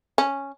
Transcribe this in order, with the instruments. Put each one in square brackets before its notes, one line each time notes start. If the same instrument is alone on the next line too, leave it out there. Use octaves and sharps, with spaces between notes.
[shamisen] C#4